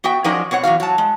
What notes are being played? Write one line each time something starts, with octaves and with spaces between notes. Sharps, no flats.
B3 F#4 E5 G5
F3 F#3 C#4 D#4 A#4 D5
B2 C4 C#5 F#5
E2 F#3 F#4 F5
F#3 A5
G#3